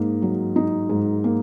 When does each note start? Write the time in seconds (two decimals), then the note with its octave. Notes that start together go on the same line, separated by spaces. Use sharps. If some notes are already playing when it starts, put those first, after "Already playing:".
Already playing: G#2 A#3 D#4
0.22 F#3
0.56 D#4
0.90 G#2
1.24 A#3